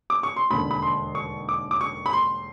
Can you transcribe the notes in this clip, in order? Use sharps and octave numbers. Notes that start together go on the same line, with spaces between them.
D6
C#6
C6
E1 D#2 D3 B5
B5
C6
C#6
D6
D6
C#6
B5
C6